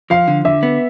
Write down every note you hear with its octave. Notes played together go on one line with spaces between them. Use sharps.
F3 F5
D3
D3 E5
B3